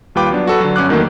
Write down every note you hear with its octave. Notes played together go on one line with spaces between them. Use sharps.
D#2 G3 F4 B4 G5 D6
F#3 B3 D4
F#4 A4 B4
D3 F#3
G1 C#4 F#5 D6 F#6
E2 D#3 F#3 A3 A#3